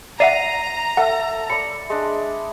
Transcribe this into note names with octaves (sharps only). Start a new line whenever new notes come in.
D5 E5 F#5 A#5 C7 D#7
A4 E5 F#5
D5 B5 C#7
G#3 D4